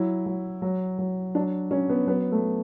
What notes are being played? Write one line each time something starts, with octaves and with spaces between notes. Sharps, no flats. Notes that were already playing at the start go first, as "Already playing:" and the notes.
Already playing: F#3 E4
F#3
F#3
F#3
F#3 D4
F#3 C#4
B3
F#3 B3
A3